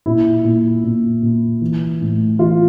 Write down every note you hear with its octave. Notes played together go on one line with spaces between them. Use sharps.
A#2 E4
A#2
A#2
A#2
E3
A2
E3 F4